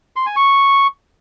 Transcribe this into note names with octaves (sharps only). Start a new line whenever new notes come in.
C6
G#5
C#6